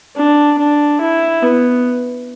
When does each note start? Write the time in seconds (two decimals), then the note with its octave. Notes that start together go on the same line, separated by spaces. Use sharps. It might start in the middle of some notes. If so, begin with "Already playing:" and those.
0.17 D4
0.59 D4
1.01 E4
1.43 B3